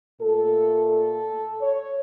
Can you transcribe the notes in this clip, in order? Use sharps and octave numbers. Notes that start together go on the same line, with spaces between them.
A#2 A3 A4
A4
C#5